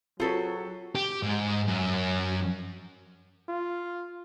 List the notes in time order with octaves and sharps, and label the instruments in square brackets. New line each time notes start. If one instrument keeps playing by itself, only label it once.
[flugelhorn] F#3 [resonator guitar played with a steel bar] C4 A4 [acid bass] F4 [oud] F#4 G#4 B4
[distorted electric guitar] G4
G#2
F#2
[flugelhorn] F4